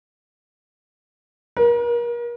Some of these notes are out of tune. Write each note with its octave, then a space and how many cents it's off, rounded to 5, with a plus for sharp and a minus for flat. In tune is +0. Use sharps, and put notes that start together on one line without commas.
A#4 +35